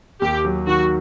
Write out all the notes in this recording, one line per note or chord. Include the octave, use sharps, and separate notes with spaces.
D#2 G4
F#3
D#3 F#4